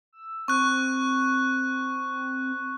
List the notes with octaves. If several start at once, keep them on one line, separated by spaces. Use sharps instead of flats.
E6
C4 C#6 F#6